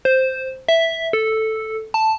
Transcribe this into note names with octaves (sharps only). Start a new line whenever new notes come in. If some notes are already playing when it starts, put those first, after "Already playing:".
C5
E5
A4
A5